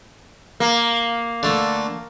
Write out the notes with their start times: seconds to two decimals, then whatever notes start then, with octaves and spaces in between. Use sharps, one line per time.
0.60 A#3
1.43 D3 A3